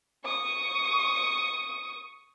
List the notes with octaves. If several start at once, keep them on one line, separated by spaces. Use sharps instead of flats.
C#6 D#6